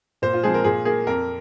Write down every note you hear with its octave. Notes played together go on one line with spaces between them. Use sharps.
A#2 C5
F4
F3 G#3 C4 G#4
A#4
A#2 G#4
A#3 G#4
F2 A#4